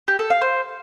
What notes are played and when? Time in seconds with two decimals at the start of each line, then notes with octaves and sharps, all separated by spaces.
0.08 G4
0.19 A4
0.30 F5
0.41 C5